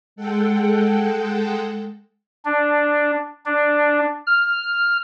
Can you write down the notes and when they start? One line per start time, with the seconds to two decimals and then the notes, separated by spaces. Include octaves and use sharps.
0.16 G#3 A4 F#5 G5
2.45 D4
3.46 D4
4.27 F6